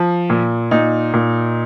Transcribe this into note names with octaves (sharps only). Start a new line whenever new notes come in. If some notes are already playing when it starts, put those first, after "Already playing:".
Already playing: F3
A#2
A#2 D#4
A#2